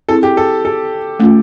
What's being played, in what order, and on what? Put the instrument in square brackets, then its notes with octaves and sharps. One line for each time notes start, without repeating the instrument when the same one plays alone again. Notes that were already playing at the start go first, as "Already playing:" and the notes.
[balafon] C4 E4 G#4 [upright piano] A4
[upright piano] G4
A4
A4
[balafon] A3 C#4 F4